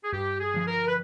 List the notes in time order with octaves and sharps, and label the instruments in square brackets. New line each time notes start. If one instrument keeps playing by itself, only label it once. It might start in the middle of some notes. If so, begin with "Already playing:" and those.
[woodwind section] G#4
[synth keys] G2 [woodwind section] G4
[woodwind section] G#4
[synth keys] D3 F3
[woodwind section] A#4
B4